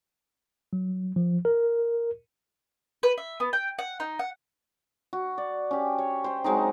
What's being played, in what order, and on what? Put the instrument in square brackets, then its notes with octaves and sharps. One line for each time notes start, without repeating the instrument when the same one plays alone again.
[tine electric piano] F#3
F3
A#4
[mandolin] B4
E5
B3
G5
F#5
D#4
F#5
[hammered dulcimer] F#4
D5
C#4 G4
C#5
C5 G5
F#3 G#3 C4 D#4